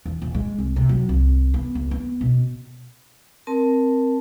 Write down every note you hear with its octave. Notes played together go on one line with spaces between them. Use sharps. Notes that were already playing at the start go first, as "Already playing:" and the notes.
E2
A#1
G#3
C2
C3
F#3
C2
B3
C#2
B3
B2
C4 A#4 A5